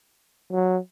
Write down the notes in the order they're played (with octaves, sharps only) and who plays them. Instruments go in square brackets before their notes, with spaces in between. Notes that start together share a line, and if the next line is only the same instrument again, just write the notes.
[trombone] F#3